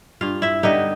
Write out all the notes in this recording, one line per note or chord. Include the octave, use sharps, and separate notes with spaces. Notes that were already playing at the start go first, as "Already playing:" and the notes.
G2 F4 F5
E4 E5
D3 G3 B3 D#4 D#5